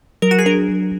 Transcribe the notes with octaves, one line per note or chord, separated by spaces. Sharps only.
F#3 A#4
F#4
G#4
D4 A#4